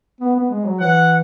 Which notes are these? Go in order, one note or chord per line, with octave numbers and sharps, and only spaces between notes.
B3
B3
G#3
F#3
E3 F#5